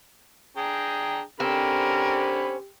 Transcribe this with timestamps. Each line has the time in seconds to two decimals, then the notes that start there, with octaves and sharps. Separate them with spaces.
0.57 D4 G#4 G5 A#5
1.40 D3 C4 C#4 G4 A#4 B5